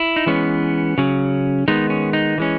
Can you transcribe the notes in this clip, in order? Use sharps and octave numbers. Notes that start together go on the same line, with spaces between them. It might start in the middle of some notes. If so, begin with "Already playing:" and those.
Already playing: E4
D#4
E3 G#3 B3 C#4
C#3 F#3 C#4
D#3 G#3 B3 D#4
C#4
D#4
E3 G#3 C#4